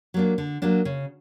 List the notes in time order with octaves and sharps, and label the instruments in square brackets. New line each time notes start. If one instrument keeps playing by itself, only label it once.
[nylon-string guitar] F#3 A#3 D4
D3
F#3 A#3 D4
C#3